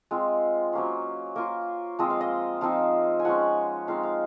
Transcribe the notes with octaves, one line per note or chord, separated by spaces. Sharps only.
G#3 C4 F4
F#3 A#3 C#4 C5
A#3 F4 A#4
F3 G#3 C4 D#5
F5
D#5
F3 C4 D#4 F5
G#5
F3 G#3 C#4 F#5
F3 G#3 C4 D#4 F5
F5